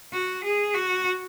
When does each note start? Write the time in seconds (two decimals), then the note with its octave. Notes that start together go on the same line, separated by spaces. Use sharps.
0.13 F#4
0.44 G#4
0.74 F#4